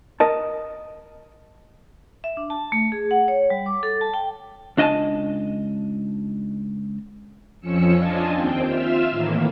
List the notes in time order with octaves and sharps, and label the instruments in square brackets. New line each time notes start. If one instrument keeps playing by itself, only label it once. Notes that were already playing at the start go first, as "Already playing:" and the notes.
[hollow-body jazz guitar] A#4 D#5 A5
[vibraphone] E5
D4
A5
A3
G#4
F#5
C#5
G3
D6
A4
A5
G5
[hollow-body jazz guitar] C#2 D4 D#5 G#5 A5
[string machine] F2 F3 C#4 E6 C#7
D4 F4 D#5 G#5 A5
D#2 C4 G5
F4 E5 F5 E6
A2 D#3 E3 A#3